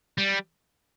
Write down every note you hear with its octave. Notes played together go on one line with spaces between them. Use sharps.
G3